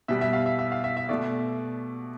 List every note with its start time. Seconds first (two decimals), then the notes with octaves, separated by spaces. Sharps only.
0.08 B2 G3 E5
0.21 E5
0.33 F5
0.46 E5
0.59 E5
0.72 F5
0.84 E5
0.97 E5
1.09 B2 A3 D5